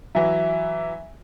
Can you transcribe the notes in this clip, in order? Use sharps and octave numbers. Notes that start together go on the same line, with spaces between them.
E3 F#3 E5